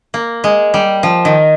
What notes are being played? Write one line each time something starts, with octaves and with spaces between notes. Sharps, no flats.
A#3
G#3
G3
F3
D#3